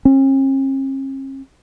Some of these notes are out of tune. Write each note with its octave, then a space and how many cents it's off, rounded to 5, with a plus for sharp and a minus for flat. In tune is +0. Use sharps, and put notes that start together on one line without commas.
C#4 -45